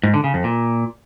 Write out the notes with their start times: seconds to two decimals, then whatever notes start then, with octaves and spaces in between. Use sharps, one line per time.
0.03 G#2
0.14 D3
0.24 C#3
0.34 F2
0.44 A#2